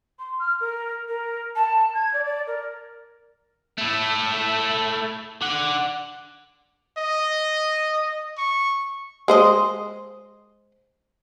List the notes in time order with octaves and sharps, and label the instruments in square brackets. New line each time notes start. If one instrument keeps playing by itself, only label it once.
[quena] C6
F6
A#4
A#4
A5
G#6
D5
D5
A#4
[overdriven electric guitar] A3 E4
D4 F#5
[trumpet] D#5
C#6
[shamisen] G#3 C5 D#5